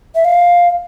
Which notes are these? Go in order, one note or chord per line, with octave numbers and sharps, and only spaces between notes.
E5
F5